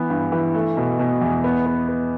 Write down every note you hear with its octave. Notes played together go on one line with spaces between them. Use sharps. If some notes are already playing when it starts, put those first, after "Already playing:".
Already playing: E3 B3
G2
E3
A3
B2
B2
E2
B3
B3
B3